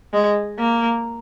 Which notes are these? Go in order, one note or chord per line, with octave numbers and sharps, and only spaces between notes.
G#3
A#3